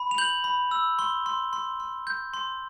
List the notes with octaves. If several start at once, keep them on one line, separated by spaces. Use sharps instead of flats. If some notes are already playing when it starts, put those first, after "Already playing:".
Already playing: B5
F7
G6 F#7
B5
E6
C6 G7
C6
C6
C6
G6
C6